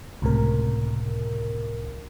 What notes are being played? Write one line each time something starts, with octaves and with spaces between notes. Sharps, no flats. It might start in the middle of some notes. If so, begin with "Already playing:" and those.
C#2 A2 C3 A#4